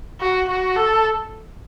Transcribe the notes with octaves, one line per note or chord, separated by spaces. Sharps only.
F#4
F#4
A4